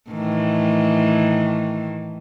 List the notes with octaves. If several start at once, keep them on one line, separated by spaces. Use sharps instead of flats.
A2 D#3 E3